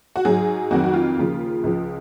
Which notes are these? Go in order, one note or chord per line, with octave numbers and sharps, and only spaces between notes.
F#4
G#2 F#3 G#4
F2 D#3 F#3 F#4
F#4
F4
D#2 C#3 F3
C#2 C#3 F3